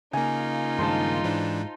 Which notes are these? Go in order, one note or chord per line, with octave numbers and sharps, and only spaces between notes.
C#3 A#3 D#4 F4 G#5
G2 D#3 G#3 C5 A5
G#2 E3 D4